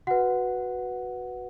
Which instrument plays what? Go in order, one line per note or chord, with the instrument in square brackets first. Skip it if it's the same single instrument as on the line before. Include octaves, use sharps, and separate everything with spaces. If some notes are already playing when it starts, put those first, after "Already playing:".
[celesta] F#4 B4 F#5